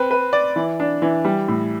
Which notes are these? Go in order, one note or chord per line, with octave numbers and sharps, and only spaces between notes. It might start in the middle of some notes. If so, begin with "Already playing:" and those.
Already playing: C4 B4
B4
D5
E3
D4
E3
G3
A2